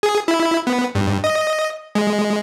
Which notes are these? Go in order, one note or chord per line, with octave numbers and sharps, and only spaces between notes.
G#4
E4
B3
G2
D#5
G#3